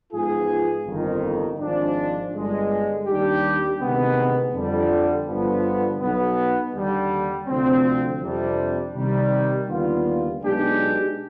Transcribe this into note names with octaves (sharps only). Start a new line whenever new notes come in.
G#2 F3 B3 F4 G#4
G1 F2 D#3
G#1 G#2 F3 G#3 D4
G1 G2 D3 G#3
D#2 D#3 G3 D4 G4
D2 C3 D#3 G#3 B3
F2 D3 G3
G1 G2 D3 F3 B3
B1 B2 B3
D#2 D3 G3
D2 C3 F3 C4
F2 C3 G3 D4
C3 D#3 G3
D#2 D3 G3 B3 F4
B1 B2 G#3 D4 G4